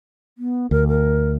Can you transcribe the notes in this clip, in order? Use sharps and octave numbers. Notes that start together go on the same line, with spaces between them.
B3
D2 A#4
A#4